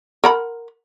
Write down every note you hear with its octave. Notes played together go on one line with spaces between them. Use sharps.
A#4 F#5 B5